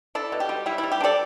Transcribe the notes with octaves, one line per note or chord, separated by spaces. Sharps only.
D4 E4 A4
B2
G4
G3
G3 E4
E4
G3
G4
D4 A4 D5